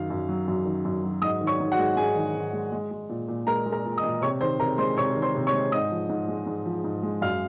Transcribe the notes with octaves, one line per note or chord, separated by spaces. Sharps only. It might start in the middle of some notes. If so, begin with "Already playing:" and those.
Already playing: F#2 D#3 F5
F#2
F#3
F#2
D#3
F#2
F#3
G#2 D#5 D#6
D#3
C#5 C#6
G#2
F#4 F#5
G#3
G#2 G#4 G#5
D#3
G#2
G#3
G#3
G#3
A#2
A#2
G#3 A#4 A#5
G#3
A#4 A#5
A#2
D#5 D#6
A#2
C3 C#5 C#6
D#3 C5 C6
C3 A#4 A#5
G#3 C5 C6
C3 C#5 C#6
D#3
C5 C6
C3
C#5 C#6
G#3
G#2 D#5 D#6
F3
G#2
G#3
G#2
F3
G#2
G#3
F#2 F5 F6